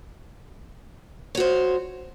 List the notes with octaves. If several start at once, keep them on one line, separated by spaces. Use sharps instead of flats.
F#4 C5 C#5